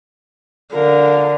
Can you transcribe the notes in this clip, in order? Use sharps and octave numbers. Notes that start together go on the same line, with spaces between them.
D3 A#4 F5